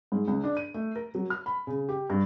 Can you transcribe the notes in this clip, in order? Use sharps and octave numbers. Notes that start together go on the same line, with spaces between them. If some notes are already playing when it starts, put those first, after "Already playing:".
G#2
C#2
D4
D#7
A3
A#4
F#3
F6
B5
C#3
G4
G2